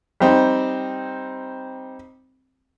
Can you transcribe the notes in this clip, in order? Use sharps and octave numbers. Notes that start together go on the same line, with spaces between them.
G3 C4 D#4